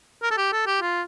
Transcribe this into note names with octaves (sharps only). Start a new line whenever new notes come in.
A#4
A4
G4
A4
G4
F4